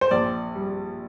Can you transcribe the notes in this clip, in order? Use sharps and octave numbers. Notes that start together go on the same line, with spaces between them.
C5
A#1 D5
G3